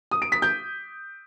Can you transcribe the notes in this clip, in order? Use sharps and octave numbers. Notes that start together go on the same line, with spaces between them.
D#6
D7
B6
G6